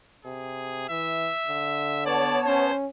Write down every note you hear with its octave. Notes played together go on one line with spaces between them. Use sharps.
C3 G#4
E3 E5
D3
B3 C#5 D5 A5
C#4 C5